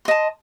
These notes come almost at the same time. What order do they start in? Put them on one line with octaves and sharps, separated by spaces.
C6 D#5 A5